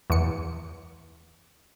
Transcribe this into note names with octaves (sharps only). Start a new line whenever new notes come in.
E2 C#7